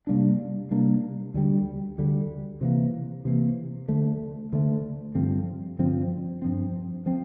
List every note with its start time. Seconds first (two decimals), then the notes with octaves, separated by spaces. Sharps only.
0.07 C3 G3 A#3 D4
0.71 C3 G3 A#3 D4
1.34 D2 D3 G3
1.98 D2 D3 G3
2.61 C3 E3 A#3
3.25 C3 E3 A#3
3.88 D2 D3 A3
4.53 D2 D3 A3
5.15 G2 D3 F3 C4
5.79 G2 D3 F3 C4
6.42 G2 F3 C4
7.06 F3 C4